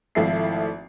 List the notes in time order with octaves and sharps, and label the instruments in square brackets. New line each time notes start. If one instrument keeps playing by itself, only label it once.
[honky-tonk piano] G#1 F3 A3 E4 E5 C7